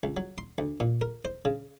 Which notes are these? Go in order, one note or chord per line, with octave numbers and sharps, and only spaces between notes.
C#2
F#3
C6
D2
A#2
A#4
C5
C#3